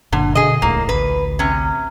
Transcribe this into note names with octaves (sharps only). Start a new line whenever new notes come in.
F#1 A#2 D3
B2 D3 G#4 D#5
D#1 C#2 A2 A#3
A1 D2 B4
C3 C#4